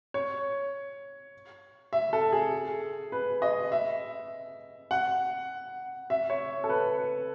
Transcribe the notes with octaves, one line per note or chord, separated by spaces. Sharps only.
C#5
E5
A4
G#4
B4
D#5
E5
F#5
E5
C#5
A4
B4